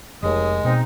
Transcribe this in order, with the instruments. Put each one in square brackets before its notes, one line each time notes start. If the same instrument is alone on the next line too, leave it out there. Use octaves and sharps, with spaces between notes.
[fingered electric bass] F1 [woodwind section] D#2 D#6 [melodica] G#3
[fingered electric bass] B2 [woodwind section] C4 D#4